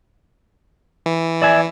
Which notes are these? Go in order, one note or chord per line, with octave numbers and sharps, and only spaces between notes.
E3
D5 E5 G#5